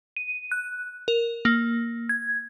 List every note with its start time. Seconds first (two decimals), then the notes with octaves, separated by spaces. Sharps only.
0.17 D#7
0.52 F#6
1.08 A#4
1.45 A#3
2.09 G#6